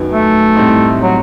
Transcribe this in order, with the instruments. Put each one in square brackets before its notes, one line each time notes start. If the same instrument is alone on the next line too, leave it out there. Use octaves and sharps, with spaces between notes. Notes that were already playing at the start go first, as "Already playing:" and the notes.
Already playing: [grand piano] F#2 D#3 F#3 B3
[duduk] A3
[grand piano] A2 G3 C4 D#4
[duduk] F#3